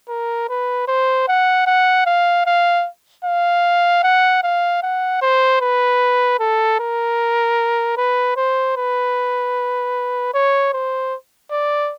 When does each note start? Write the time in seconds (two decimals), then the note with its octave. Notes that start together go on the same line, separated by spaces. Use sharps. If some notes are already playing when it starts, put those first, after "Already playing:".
0.09 A#4
0.49 B4
0.88 C5
1.28 F#5
1.67 F#5
2.06 F5
2.46 F5
3.25 F5
4.03 F#5
4.43 F5
4.83 F#5
5.22 C5
5.61 B4
6.40 A4
6.80 A#4
7.97 B4
8.37 C5
8.77 B4
10.34 C#5
10.73 C5
11.51 D5